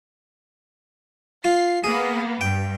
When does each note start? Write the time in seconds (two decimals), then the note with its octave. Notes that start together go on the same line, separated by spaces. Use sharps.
1.44 F4 C7
1.84 A#3 B3 G#4
2.41 G2 G5